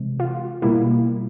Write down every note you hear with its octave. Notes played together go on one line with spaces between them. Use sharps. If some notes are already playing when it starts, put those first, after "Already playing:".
Already playing: C3 E3 G#3
F4
B2 G3 A#3 E4